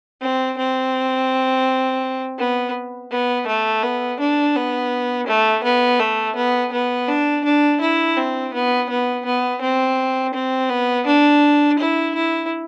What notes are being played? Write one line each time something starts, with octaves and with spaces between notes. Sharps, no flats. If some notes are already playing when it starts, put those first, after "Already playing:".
C4
C4
B3
B3
A3
B3
D4
B3
A3
B3
A3
B3
B3
D4
D4
E4
C4
B3
B3
B3
C4
C4
B3
D4
E4
E4